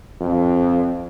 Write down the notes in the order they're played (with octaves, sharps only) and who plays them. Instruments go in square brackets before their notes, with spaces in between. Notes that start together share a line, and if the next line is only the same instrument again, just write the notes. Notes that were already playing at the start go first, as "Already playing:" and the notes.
[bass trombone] F2